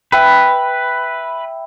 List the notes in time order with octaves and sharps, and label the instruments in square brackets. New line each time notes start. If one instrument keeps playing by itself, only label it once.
[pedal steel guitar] B4 [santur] E5 G5 B5